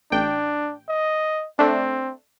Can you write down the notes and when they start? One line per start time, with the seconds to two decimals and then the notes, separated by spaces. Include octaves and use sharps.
0.12 A1 D4 G5
0.89 D#5
1.59 A3 C4 D4